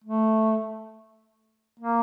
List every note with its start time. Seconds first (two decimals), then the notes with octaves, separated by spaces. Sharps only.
0.05 A3
1.80 A#3